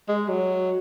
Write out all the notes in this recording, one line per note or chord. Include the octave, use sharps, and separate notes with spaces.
G#3
F#3